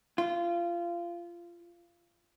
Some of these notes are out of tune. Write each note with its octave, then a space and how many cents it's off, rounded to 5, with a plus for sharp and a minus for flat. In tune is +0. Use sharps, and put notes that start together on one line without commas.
F4 -20